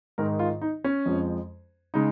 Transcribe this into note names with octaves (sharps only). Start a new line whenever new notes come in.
G#2 D#3 G#3 A#4
F4
D#4
C#4
F2 F3 G#3
C#3 G#3 D#4